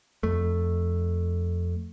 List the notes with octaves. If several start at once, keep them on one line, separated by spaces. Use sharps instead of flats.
F2 A3